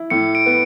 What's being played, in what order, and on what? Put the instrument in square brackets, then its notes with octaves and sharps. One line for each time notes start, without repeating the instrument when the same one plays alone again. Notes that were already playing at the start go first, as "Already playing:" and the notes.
Already playing: [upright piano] E4
[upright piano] A2 [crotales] C#7
[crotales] D7
[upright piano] B3